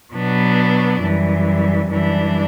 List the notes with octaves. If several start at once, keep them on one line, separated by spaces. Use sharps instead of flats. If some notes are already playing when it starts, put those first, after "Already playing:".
B2 F#3 B3 D4
F#2 E3 G3
F#2 E3 G3 D4